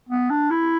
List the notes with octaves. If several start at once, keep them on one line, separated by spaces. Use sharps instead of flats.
B3
D4
E4